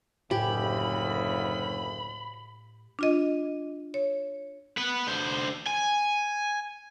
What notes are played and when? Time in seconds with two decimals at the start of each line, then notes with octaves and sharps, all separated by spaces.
0.31 F#1 D2 A2 G4 G5 G#5 B5
2.99 D4 F4 D#5
3.94 C#5
4.78 B3 B4
5.08 D3 C5
5.66 G#5